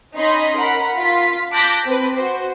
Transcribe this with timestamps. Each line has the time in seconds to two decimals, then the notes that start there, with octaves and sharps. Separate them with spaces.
0.16 C#4 D#4 D#5 B5 C6
0.58 A#4 F#5 B5
0.98 F4 B6
1.52 A5 D6 F#6 G6 A#6 B6
1.85 C4 B4
2.16 F#4 C5